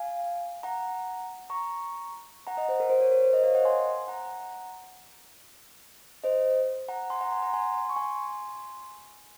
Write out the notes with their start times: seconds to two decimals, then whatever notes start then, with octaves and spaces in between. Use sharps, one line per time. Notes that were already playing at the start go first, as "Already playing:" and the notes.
Already playing: F5 G#5
0.63 F#5 A#5
1.50 A#5 C#6
2.47 F#5 A#5
2.57 D#5 F#5
2.69 C5
2.80 A#4
2.89 C5
3.01 A#4 C#5
3.11 A#4
3.22 C5
3.33 C5 D#5
3.43 C#5 F5
3.55 D#5 F#5
3.65 G#5 C6
4.08 F#5 A#5
6.24 C5 D#5
6.88 F#5 A#5
7.10 G#5 C6
7.21 F#5 A#5
7.32 G#5 C6
7.42 F#5 A#5
7.53 G#5 C6
7.89 C#6
7.96 G#5 C6